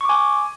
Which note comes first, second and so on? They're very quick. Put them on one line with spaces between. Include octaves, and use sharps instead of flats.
C#6 D6 G#5